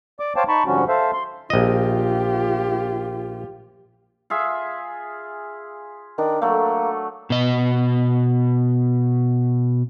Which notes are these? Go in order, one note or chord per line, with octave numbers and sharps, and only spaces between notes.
D5 D6
C5 C#5 F5 G5 A5 D6
D#4 A5 B5 C#6
G#2 D3 F3 G3 C#4 F#4
A4 C5 E5 F5
C6
A#1 F4 G4 D#5
F4 G#4 E5
D#3 D4
F#3 A3 A#3
B2 D#5